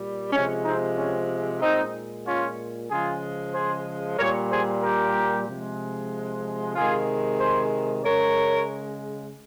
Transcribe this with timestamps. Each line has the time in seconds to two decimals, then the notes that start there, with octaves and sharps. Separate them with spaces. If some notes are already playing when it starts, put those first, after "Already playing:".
Already playing: A#2 G3
0.33 C3 F3 G#3 C#4
0.64 C4 D#4
0.98 C#4
1.61 A#2 G#3 C4 D#4
2.26 C#4 F4
2.90 C#3 F3 G#3 F4 G#4
3.54 G#4 C5
4.18 A#2 G3 A#4 C#5
4.51 G#4 C5
4.83 G4 A#4
5.48 C3 F3 G#3
6.76 C3 D#3 G#3 F4 G#4
7.40 G#4 C5
8.04 C#3 G#3 A#4 C#5